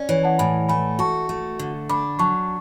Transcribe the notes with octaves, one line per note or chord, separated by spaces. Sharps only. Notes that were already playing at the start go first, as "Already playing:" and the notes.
Already playing: C#4 D5
E3 C#5
F#5 A5
A2 G#5 B5
A3 G#5 B5
F#4 A5 C#6
A3
D3
D4 B5 D6
F#3 A5 C#6